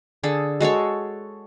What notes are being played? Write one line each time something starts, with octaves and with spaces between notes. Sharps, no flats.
D3 G#4 A4
G#3 F#4 A4 C#5